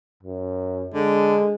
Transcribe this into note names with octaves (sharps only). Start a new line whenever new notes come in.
F#2
D3 G#3